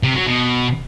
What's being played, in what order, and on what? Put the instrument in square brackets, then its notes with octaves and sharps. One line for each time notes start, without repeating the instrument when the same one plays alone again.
[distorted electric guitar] C3
F#3
B2